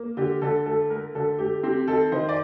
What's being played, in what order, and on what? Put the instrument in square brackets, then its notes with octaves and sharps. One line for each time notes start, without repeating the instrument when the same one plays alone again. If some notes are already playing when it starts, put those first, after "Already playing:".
Already playing: [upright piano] A#3
D3 G4
D3 A4
A3 A4
A3 A#4
D3 A4
A3 G4
C4 G4
D#3 A4
D#3 C5
D5